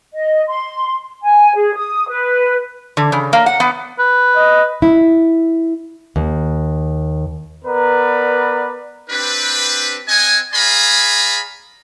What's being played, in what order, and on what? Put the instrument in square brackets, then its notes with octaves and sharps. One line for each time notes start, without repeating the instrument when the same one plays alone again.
[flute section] D#5
C6
G#5
G#4
D#6
B4
[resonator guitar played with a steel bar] D3
C#3
A#3
F#5
B3
[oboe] B4
[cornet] D#5
[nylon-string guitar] E4
D#2
[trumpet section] B3 A#4 B4 D5 A#5
C4 D4 G4 B4
C4 D#5 F#5 G#5
G#4 D5 F5 G#5 A#5 B5